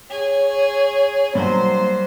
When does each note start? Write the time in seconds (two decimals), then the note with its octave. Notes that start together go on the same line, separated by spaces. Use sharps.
0.10 G#4 C#5
1.35 G2 F#3 A#3 C5